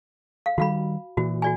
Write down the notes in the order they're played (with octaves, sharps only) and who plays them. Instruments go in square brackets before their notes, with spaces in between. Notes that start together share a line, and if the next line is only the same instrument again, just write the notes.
[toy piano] F5
[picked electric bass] D#3 G3 [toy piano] F#4 F5 B5
[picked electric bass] A#2 E3 [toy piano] F#4
[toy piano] F#4 D5 G#5